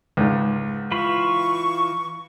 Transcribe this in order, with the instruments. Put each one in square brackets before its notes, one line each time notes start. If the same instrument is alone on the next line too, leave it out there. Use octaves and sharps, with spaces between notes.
[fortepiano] C#2 G#2
[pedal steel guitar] E3 F4 B5 [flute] C#6